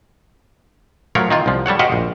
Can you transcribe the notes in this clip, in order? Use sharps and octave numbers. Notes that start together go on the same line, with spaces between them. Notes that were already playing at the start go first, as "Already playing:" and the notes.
F3 F#3 A3 A#4 C#5 F5
D#3 A#3 F4
C2 F3
G3 A4 C#5 F#5
F#4 G4 C5 D#5 F5 F#5
A#1